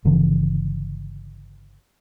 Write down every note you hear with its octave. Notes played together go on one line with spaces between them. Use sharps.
G1 C#3 E3 F3